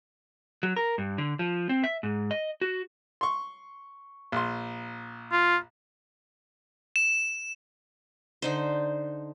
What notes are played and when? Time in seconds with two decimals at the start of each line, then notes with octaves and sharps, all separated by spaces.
0.63 F#3
0.76 A#4
0.98 G2
1.18 D3
1.39 F3
1.69 C4
1.84 E5
2.03 G#2
2.31 D#5
2.61 F#4
3.21 C6 C#6
4.32 A#1 C6
5.32 F4
6.96 E7
8.42 D3 D#4 C5